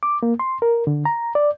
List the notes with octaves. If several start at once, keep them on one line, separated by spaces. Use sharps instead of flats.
D6
A#3
C6
A#4
D3
A#5
D5